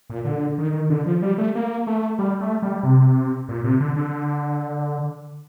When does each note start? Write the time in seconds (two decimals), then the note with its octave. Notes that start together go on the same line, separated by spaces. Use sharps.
0.10 A#2
0.25 D3
0.58 D#3
0.90 D3
1.06 F3
1.22 G3
1.38 A3
1.55 A#3
1.87 A3
2.19 G3
2.41 A3
2.62 G3
2.83 C3
3.49 A#2
3.64 C3
3.80 D3
3.96 D3